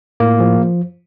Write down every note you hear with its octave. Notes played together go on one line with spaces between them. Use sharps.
A2 A#3
F3